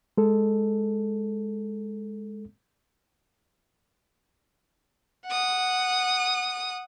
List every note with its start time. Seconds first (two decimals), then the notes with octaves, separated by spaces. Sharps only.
0.18 G#3 A4
5.27 F#5 D#6